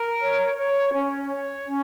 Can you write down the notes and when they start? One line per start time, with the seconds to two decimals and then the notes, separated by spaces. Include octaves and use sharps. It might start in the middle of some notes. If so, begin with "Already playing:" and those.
Already playing: A#4
0.20 C#5
0.55 C#5
0.92 C#4
1.28 C#5
1.65 C#4